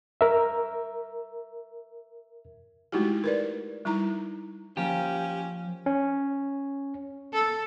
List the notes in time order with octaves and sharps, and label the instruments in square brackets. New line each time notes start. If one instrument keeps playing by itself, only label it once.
[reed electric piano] A#4 E5
[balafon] G#3 A3 D#4 E4 F#4 G4
A#4 B4 D5
G3 D#4 E4 A#5
[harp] F3 A#3 [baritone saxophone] C#4 [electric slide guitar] G4
[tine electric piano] C#4
[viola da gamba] A4